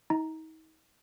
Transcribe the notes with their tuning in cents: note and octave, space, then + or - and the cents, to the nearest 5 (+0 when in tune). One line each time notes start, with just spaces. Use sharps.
D#4 +40 A#5 +0